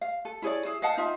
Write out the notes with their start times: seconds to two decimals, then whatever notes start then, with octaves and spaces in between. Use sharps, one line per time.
0.01 F5
0.25 A4
0.42 E4 G#4 C#5 D5
0.65 E4 G#4
0.82 D#5 F5 F#5 A5
0.97 D#4 F4 E5 G5